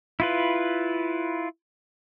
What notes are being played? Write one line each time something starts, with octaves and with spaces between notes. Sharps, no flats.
E4 F4 B4